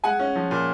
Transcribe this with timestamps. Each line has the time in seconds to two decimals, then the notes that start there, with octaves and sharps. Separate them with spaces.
0.04 G#3 F#5 G#5
0.19 C#4
0.35 F3
0.51 A#2